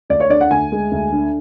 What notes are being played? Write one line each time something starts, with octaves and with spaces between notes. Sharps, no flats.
D2 D5
C#5
D3 D5
F#5
D2 G#5
G#3
D2
D3